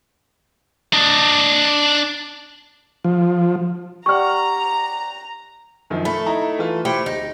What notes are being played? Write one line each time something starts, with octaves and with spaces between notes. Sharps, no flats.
D4 D#5
F3
G4 D5 F#5 A#5 C#6 F6
F#2 D#3 F3
A3 B5
D#4 E4 A#5
E3 F4
A3 E4 G4 C5
D1 D#4